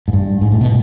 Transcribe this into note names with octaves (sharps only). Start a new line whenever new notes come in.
G#2
G2
G#2
A2
B2